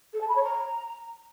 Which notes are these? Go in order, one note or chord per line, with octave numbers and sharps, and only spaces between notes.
A4
A5
B5
C#5
A#5